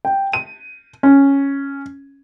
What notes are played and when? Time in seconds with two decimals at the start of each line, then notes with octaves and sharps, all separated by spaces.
0.05 G5
0.33 D#7
1.03 C#4